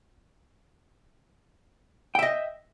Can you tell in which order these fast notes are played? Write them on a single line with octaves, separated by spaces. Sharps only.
G5 E5 D#5